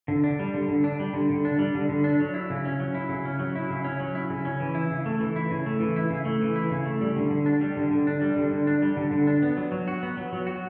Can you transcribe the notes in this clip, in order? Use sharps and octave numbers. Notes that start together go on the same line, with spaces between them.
D3
D4
G3
D3
D3
D4
G3
D3
D3
D4
G3
D3
D3
D4
F#3
E4
C#3
C#4
F#3
E4
C#3
C#4
F#3
E4
C#3
C#4
F#3
E4
C#3
C#4
E3
E4
C#3
A3
E3
E4
C#3
A3
E3
E4
C#3
A3
E3
E4
C#3
A3
G3
D3
D3
D4
G3
D3
D3
D4
G3
D3
D3
D4
G3
D3
D3
D4
B3
F#3
F#3
F#4
B3
F#3
F#3
F#4